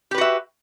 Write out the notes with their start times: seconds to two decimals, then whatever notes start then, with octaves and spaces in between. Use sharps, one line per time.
0.11 G4
0.15 B4
0.18 F#4
0.21 E5